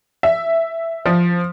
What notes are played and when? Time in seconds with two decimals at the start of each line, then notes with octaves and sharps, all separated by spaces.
0.23 E5
1.06 F3